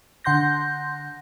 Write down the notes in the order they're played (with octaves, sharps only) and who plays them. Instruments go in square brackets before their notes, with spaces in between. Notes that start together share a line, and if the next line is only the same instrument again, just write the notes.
[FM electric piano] D3 F#5 C6 G6 A#6